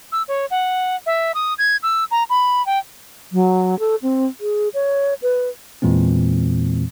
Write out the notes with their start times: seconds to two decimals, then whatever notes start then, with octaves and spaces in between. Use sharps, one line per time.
0.12 E6
0.28 C#5
0.51 F#5
1.06 E5
1.35 D#6
1.58 G#6
1.83 E6
2.11 A#5
2.30 B5
2.66 G5
3.33 F#3
3.79 A4
4.02 C4
4.40 G#4
4.74 C#5
5.22 B4
5.82 E2 A#2 E3 G#3 C4